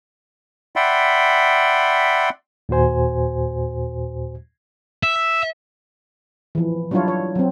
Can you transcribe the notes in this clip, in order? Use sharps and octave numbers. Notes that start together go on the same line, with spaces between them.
D5 E5 F#5 G5 B5 C6
D#2 A#2 F#4 C5 G#5
E5
E3 F3
F#3 G3 D4 E4 F4 C#5
C#5
F#3 C4